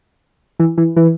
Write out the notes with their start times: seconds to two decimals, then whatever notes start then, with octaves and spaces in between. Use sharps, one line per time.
0.59 E3
0.78 E3
0.96 E3